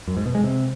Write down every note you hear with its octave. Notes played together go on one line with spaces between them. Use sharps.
F#2
G#2
B2
G#3
C3